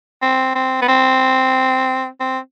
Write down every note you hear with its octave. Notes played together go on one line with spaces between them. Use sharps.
C4
C4
B3
C4
C4